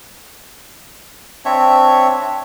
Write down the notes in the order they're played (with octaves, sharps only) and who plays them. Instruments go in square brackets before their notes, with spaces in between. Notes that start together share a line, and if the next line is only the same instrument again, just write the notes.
[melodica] C4 D4 C#5 E5